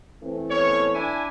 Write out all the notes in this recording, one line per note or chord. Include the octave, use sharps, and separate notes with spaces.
E3 A3 C4
B3 C#4 C#5
D4 E4 G#5